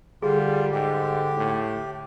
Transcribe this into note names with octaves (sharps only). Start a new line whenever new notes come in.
D3 G3 F4 G#4
G#2 G4
A2